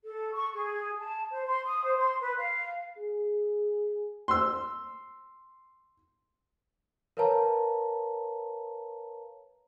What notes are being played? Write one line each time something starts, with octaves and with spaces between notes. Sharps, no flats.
A4
C#6
G#4
A5
C5
C6
D#6
C5
C6
B4
F5
G#4
C6 E6
A#4 B4 C#5 F5 A5 A#5